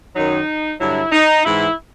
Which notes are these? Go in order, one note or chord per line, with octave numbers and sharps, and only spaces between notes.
F#2 D#3 F#3 D#4
G2 D3 F#3 E4
D#4
G#2 E3 E4